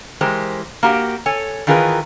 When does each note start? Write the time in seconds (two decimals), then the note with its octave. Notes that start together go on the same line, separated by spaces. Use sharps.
0.21 E3 G#3 G4 A#4 C5
0.83 A#3 F#4 G4
1.26 A4 C#5 G#5
1.67 D#3 E3 F4 G#4 A#4 B4